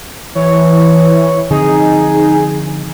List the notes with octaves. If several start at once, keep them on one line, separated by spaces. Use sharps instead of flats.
E3 C#5
D3 F3 C4 D#4 G#4